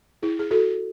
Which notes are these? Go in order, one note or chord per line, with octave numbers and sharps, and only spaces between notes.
E4 G#4
G#4
F#4 A4